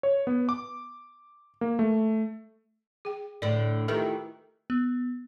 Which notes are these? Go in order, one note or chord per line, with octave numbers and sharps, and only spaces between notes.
C#5
B3
D6
A#3
A3
G#4 G5
A2 D3 D5
D#3 E3 A3 F4 G4 A4
B3